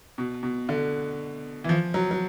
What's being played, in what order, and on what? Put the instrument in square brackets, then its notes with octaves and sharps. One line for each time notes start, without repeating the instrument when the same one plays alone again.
[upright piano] B2
B2
D3
E3
F3
F#3
F#3